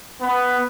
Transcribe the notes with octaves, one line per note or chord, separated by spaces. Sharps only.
B3